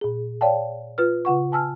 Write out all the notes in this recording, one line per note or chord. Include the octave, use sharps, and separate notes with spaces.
A#2 G#4
C#5 D5 F5 G5 A5
F4 B4 F6
C#3 F4 F#5 C#6
G#5 A5 E6 F6